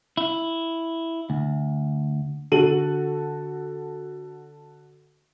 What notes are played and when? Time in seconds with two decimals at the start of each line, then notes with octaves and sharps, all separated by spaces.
0.17 E4
1.30 D2
2.52 D3 F#4 A4 D#7 F#7